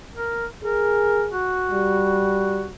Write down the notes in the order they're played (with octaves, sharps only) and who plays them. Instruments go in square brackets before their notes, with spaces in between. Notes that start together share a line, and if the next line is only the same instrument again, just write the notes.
[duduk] A#4
[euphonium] G#4 [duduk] A#4
[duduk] F#4
[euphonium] G3